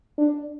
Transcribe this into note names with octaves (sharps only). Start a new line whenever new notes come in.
D4